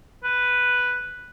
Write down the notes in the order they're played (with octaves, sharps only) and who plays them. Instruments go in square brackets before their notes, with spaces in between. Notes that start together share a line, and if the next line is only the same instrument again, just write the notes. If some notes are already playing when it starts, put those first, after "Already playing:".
[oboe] B4